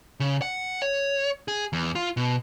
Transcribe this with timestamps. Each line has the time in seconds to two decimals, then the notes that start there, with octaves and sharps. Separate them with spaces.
0.20 C#3
0.42 F#5
0.82 C#5
1.48 G#4
1.73 E2
1.95 F4
2.17 B2